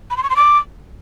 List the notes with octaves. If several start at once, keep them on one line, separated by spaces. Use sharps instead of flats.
B5
C6
C#6
C6
D6